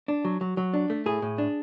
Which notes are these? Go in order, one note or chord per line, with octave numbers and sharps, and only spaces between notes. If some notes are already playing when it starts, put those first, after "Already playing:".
D4
F#3
F#3
F#3
D4
A3
A2 G#4
A2
D4